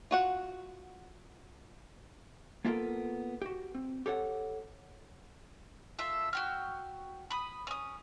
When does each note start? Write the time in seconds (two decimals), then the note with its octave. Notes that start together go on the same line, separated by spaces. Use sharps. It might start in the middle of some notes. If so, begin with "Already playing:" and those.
0.11 F4 F#4 F#5
2.65 A#3 B3 F4 G4 A4 A#4
3.42 F#4 G4
3.75 C4
4.06 G4 A4 C#5 F#5
5.99 F4 A4 E5
6.33 F#4 G5 F6
7.31 B5 D#6
7.67 C#4 D#6